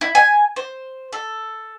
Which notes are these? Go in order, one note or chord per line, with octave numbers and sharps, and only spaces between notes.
E4
G#5
C5
A4